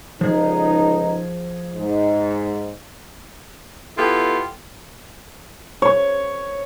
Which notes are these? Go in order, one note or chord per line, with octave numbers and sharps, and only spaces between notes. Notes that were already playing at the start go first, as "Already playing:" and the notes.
C#2 D3 F3 D#4 G#4
G#2
B3 E4 F4 G4 A4
C#5